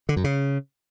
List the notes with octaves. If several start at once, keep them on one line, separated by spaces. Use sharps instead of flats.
D3
F#2
C#3